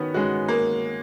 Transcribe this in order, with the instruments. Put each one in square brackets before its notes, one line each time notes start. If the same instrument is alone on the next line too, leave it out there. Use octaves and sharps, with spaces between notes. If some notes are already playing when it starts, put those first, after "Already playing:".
Already playing: [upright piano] D#3 C#4 F#4 [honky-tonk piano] B3
[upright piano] G#3 C#4 F#4
[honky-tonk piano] A#3